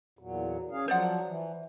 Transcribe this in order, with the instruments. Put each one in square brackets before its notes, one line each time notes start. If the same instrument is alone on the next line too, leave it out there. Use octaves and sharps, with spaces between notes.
[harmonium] E2 A#2 F#3
C#4 G#4 F5
[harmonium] F3 F#3 [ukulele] C5 D5 F#5
[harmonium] E3